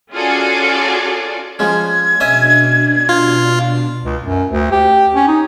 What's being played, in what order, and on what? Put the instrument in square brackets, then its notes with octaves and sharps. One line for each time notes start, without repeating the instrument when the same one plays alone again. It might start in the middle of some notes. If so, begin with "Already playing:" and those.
[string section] C#4 F4 F#4 G#4 A4 D5
[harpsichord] F3 G#3 C#4 [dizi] G#6
[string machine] B2 D4 [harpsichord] C#4 D#5 E5
[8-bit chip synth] F4
[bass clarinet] C#2
F#2
D2
G4
C#4
D#4